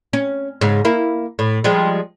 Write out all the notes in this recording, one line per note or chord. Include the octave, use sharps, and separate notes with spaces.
C#4
G#2 C#3
A#3 E4
A2
F3 G3 G#3